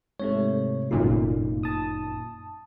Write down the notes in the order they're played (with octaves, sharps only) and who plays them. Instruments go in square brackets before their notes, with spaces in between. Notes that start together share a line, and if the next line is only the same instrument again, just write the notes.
[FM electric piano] G#2 C3 A3 [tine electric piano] C#5
[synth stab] G1 F#2 A#2 [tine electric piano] D#4
[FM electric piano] A5 D#6